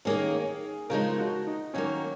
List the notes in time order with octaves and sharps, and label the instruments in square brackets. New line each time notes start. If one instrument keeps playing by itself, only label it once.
[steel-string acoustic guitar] D#3 A#3 C#4 [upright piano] G#4
[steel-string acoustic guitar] C#3 F3 G#3 D#4 [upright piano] A#4
[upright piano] F#4
D#4
[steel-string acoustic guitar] D#3 F#3 A#3 [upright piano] C#4